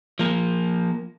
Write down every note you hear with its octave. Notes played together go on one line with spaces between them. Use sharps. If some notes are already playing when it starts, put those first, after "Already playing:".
F3 A#3